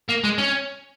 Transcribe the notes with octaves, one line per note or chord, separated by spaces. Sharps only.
A#3
G#3
C#4